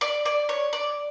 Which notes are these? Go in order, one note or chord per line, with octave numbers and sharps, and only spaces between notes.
D5
D5
C#5
D5